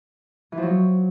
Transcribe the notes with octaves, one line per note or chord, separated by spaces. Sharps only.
E3
F3
F#3